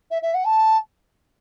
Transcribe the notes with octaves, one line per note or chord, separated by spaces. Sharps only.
E5
E5
F#5
A5